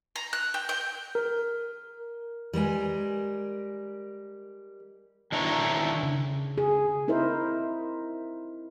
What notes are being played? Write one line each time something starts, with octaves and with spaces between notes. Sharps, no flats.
A#5
F#6
G5
G5
A#4
G3 G#3 A#4 G#5
D#3 D4 E4 C#5 A#5
C#3
G#4
C4 D#4 E4 A#4 C5 E5